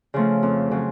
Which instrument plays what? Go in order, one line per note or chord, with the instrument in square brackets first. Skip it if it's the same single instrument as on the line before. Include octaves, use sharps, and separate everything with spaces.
[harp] C#3 F3 A3
F2
C#3 F#3